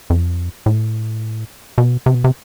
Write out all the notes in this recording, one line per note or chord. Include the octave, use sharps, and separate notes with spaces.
F2
A2
B2
C3
B2
C3